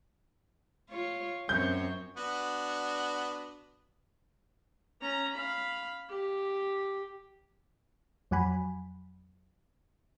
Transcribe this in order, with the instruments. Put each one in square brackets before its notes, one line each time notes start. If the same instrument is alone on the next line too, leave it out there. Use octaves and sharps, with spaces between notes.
[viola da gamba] F4 C#5
[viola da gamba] F#2 C4 C#5 [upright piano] G6
[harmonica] B3 D4 F#4
[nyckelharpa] C#4 A#5
F5 B5
G4
[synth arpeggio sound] F2 F#3 F#5 G#5 B5